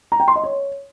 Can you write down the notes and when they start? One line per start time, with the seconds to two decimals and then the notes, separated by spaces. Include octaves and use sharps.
0.12 A#5
0.20 G5
0.28 C6
0.36 D#5
0.44 C#5